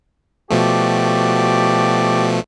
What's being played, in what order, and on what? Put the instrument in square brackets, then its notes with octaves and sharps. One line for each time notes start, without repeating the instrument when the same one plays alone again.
[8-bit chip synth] B2 F3 A3 [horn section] F#4 G4 D5